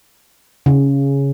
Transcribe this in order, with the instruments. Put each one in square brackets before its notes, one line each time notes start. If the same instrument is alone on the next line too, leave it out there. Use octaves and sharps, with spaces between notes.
[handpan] C#3